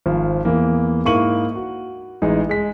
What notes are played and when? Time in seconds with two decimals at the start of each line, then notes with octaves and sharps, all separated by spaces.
0.06 G#1 F3
0.45 E2 E3 A#3
1.05 G#2 A#3 E4 C#6 D#7 F#7
1.56 F#4
2.22 A1 G#3 D#4
2.49 G#3 B6